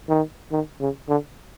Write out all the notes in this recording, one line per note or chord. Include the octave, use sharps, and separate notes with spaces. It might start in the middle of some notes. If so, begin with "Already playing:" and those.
D#3
D#3
C#3
D3